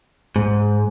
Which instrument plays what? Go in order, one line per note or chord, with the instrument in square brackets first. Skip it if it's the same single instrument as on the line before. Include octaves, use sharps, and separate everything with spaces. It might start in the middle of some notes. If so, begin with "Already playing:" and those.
[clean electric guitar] G#2